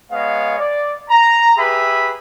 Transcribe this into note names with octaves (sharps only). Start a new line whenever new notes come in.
G#3 B3 C#5 D#5 F5
D5
A#5
G4 G#4 B4 E5 B5